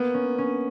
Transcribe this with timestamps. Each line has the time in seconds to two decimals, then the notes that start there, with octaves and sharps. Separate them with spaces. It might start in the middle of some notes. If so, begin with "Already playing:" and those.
Already playing: A#3 B3
0.14 C#4
0.38 C#4